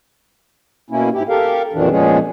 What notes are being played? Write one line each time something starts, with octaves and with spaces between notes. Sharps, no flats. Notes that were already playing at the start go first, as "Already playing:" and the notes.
B2 A#3 C#4 E4
G#2 E4 G4
G4 A4 A#4 F5
F2 A#2 D#3 E3 F#3 D4
A#2 F3 G#3 B3 C#4 G#4